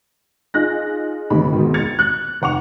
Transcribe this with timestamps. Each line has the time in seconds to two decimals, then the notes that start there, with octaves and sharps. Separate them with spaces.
0.54 D#4 F4 G#4 F#6 A#6
1.30 G1 C3 E3 A3 D#4 B5
1.52 G#2 B2 D#3
1.74 G#6 A6 C#7 F7
1.99 F#6
2.42 F1 F#5 C#6 F7